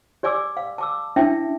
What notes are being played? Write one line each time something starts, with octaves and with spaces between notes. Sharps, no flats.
G4 D5 G#5 D6 E6
F5
A5 D6 E6
C#4 D4 E4 E5 G5 A5